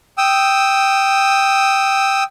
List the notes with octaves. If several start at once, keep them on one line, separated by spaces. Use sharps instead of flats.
G5 D#6 E6